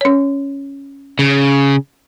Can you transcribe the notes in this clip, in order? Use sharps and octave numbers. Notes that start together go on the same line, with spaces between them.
C#4 C#5
C#3